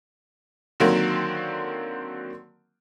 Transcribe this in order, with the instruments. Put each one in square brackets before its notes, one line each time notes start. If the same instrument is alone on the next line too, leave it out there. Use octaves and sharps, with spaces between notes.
[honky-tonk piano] D3 D#3 F#3 A#3 C4